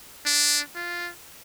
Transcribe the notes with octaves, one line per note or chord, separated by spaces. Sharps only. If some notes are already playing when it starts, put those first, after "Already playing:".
D4
F4